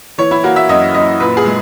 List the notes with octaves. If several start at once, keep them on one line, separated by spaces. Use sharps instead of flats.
E3 C#5
E4
A#3 F#4
E5
F#2 D#5
F#2 D#5
A#2 B4
G#4
G#3